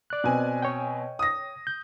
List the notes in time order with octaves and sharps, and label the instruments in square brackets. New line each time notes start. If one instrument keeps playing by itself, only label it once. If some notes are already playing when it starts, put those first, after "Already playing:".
[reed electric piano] D5 F#6
[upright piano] B2 C4 G#5
[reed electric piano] C#5 G5
[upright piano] D#6 A#6
[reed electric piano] G6